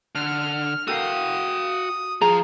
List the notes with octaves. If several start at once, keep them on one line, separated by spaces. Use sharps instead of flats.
D3 F6
F#4 A4 A#4 F5 G5 D#6
F3 G#4 A#5